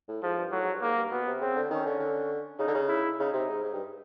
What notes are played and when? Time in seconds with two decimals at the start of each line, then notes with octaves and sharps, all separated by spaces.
0.08 A2
0.23 G#2 F3
0.38 G2
0.52 A2 F#3
0.62 G#2
0.72 G2
0.82 G#2 A#3
0.97 G2
1.11 B2 B3
1.27 C3
1.41 C#3 C4
1.56 D3
1.70 D#3 C#4
1.86 D3
2.00 D3
2.59 C#3 D#4
2.67 D3
2.75 C#3
2.89 E4
3.19 C#3 D#4
3.33 C3
3.49 G#2
3.63 G#2
3.73 G2